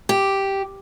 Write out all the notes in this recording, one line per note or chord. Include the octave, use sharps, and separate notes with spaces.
G4